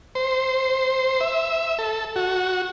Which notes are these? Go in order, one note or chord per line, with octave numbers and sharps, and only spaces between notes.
C5
E5
A4
F#4